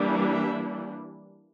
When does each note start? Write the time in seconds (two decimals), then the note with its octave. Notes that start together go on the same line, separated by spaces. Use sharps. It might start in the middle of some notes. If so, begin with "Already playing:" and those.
Already playing: E3 G3 A#3 D4
0.32 E5